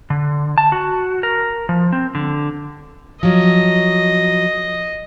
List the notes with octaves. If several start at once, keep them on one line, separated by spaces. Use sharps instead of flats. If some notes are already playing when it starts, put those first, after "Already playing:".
D3
A5
F#4
A#4
F3
C4
D3
F3 F#3 D#5